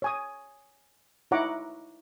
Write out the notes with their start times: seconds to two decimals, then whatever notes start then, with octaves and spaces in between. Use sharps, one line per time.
0.02 C#5 G#5 D#6
1.31 D#4 E4 C#5 F#5 A#5 D6